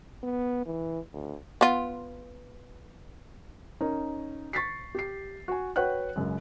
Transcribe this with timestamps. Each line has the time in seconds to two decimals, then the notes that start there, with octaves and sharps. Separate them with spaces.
0.23 B3
0.66 E3
1.13 D2
1.61 B3 F4
3.81 C#4 D#4 A#4
4.53 C#6 A6 B6 C7
4.95 G4 C7
5.48 F#4 G#5
5.76 F#4 B4 C#5 F#5 G5 F#6
6.16 C#2 F#2 C#3